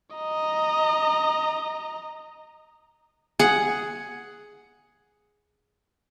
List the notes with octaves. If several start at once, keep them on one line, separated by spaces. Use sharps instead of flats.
D#5 A#5
G#4 F#5